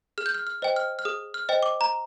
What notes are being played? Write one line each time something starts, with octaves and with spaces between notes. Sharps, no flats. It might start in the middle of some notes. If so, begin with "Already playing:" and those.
G#4 F6
G6
F6
F6
C5 D#5 G5
F6
F6
G#4 D#6
F6
C5 D#5 G5
D6
A#5